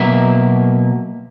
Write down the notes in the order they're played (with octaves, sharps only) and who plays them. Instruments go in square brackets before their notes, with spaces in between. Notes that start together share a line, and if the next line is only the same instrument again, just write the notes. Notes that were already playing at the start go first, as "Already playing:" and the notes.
Already playing: [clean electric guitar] B2 F#3 A#3 E5